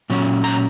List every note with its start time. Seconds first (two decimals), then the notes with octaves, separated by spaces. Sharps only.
0.10 A#2 F#3 C#4
0.44 A#5